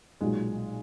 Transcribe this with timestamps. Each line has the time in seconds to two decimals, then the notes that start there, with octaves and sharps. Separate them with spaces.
0.21 B1 A#2 F#3 G#3